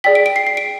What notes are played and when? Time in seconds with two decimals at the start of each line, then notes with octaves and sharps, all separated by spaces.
0.04 G#4 D5 G5 B6
0.15 D7
0.26 D7
0.36 C7
0.47 C7
0.57 D7